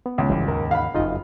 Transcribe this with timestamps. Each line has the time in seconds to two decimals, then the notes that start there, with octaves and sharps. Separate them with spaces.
0.06 B3
0.18 C#2
0.29 F#1 G2 E3 G3
0.48 D#2 G#2 C#3 A#4
0.71 F5 F#5 B5
0.95 F#1 F2 C#3 D#4 F4 D#5